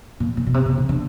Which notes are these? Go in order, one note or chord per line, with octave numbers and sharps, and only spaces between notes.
A#2
A#2
B2
C3
C3
C#3
D3